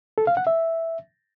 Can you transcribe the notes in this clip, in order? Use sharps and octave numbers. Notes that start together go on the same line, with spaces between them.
A4
F5
F#5
E5